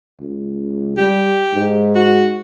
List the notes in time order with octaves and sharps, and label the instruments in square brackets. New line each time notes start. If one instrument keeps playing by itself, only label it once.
[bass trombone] C#2
[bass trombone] G3 [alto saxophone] G4
[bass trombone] G#2
[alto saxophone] F#4